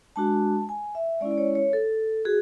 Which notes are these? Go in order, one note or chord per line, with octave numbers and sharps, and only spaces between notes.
G#3 D4 F#4 A5
G#5
E5
G#3 C#4 E4 D5
D5
C#5
C#5
A4
F#4 G#4